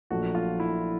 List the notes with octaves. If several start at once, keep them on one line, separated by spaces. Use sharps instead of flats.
A#1 A#2 F#3 A3 F#4
F4
E4